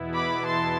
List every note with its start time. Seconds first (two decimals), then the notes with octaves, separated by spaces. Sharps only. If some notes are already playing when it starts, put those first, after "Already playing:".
Already playing: E2 B2 B3 E4
0.14 B5 D6
0.46 A5 C6